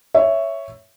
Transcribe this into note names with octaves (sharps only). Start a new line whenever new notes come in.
C#5 E5